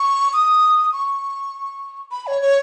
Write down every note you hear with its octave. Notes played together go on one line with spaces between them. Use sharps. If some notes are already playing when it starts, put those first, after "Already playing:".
Already playing: C#6
D#6
C#6
B5
C#5
C#5